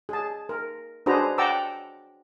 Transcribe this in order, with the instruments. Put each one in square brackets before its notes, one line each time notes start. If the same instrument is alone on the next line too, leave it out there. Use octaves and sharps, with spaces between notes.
[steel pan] G#4 A5
A#4
D4 F#4 G#4 B4 C5 A#5
F#5 G5 A5 A#5 D6 E6